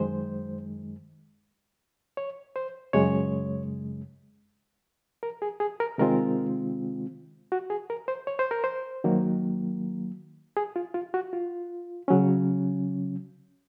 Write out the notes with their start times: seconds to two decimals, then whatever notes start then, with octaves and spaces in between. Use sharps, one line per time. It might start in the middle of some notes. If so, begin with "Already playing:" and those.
Already playing: F#2 D#3 G#3 C5
2.17 C#5
2.56 C5
2.93 F#2 C#3 G#3 C#5
5.23 A#4
5.42 G#4
5.60 G#4
5.80 A#4
5.98 C3 D#3 G#3 C4 F4 A#4
7.52 F#4
7.70 G#4
7.90 A#4
8.08 C5
8.27 C#5
8.39 C5
8.51 A#4
8.64 C5
9.04 D#3 F#3 A#3
10.57 G#4
10.76 F4
10.94 F4
11.14 F#4
11.33 F4
12.08 C#3 F#3 C#4